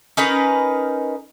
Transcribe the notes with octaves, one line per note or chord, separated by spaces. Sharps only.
C#4 D#4 A#4 B4